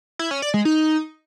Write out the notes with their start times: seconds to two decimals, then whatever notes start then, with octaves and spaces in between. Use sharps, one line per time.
0.19 E4
0.31 C#4
0.42 D5
0.54 G#3
0.65 D#4